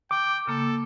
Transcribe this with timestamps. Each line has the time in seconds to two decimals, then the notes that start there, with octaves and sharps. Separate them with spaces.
0.11 G5 D6
0.47 C#3 A#3 A4